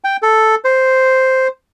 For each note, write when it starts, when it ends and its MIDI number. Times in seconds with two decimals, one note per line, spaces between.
0.04 0.17 79
0.23 0.55 69
0.64 1.48 72